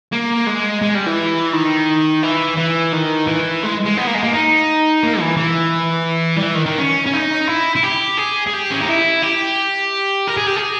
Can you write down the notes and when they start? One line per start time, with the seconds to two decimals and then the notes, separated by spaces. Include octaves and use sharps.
0.12 A#3
0.46 G#3
0.82 G#3
0.94 G3
1.06 E3
1.53 D#3
2.23 E3
2.57 E3
2.93 D#3
3.27 E3
3.63 G#3
3.85 G#3
3.97 B3
4.07 A#3
4.14 G#3
4.23 A#3
4.32 D#4
5.03 A#3
5.20 E3
5.37 E3
6.36 G3
6.42 E3
6.55 D#3
6.65 D#3
6.78 C#4
7.06 C#4
7.13 D#4
7.47 E4
7.76 E4
7.83 G4
8.17 G#4
8.47 G#4
8.53 G4
8.71 C#4
8.80 D#4
8.88 E4
9.22 G4
10.27 A#4
10.37 G#4
10.47 G4
10.56 G#4